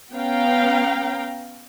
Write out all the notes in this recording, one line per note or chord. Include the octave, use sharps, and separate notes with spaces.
B3 C#4 F5 G5 A#5